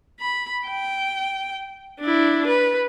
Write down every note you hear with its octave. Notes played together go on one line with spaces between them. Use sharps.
B5
G5
D4 E4
B4